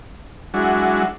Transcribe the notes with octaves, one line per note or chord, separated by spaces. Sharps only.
F#3 G#3 D4 E4 F#4